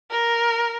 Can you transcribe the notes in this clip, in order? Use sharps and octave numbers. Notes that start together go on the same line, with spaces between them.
A#4